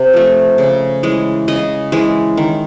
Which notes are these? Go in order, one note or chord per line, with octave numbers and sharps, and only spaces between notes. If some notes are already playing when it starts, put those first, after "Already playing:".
Already playing: C3
F3 A3
C#3
E3 G#3
C#3 D#5
E3 G#3
D#3